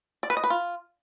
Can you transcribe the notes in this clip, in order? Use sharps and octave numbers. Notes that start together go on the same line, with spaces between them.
D5
B4
D#5
B4
F4